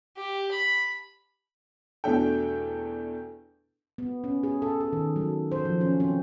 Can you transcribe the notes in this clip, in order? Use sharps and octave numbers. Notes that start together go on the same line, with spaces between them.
G4
B5
E2 B2 A3 D4 A4 G5
B3
C#4
G#4
A4
G#4
D#3
F#3
C5
F3
C#4
C4